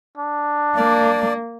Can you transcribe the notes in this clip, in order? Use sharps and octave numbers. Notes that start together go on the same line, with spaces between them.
D4
A#3 D5